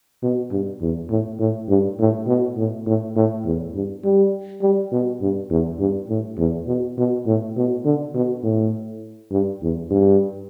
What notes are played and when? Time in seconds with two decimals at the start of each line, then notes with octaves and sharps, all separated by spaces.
0.23 B2
0.51 G2
0.81 E2
1.10 A2
1.39 A2
1.69 G2
1.99 A2
2.27 B2
2.57 A2
2.86 A2
3.16 A2
3.46 E2
3.74 G2
4.04 G3
4.62 G3
4.92 B2
5.21 G2
5.50 E2
5.79 G2
6.09 A2
6.38 E2
6.67 B2
6.98 B2
7.26 A2
7.56 B2
7.85 D3
8.14 B2
8.43 A2
9.31 G2
9.62 E2
9.90 G2